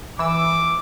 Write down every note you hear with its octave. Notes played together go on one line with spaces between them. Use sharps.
E3 D6 E6